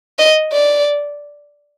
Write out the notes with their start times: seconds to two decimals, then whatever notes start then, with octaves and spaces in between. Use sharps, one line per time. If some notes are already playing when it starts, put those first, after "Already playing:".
0.19 D#5
0.53 D5